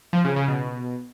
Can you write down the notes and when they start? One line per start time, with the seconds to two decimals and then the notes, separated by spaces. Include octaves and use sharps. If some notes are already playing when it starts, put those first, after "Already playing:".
0.13 F3
0.25 C#3
0.36 C#3
0.48 B2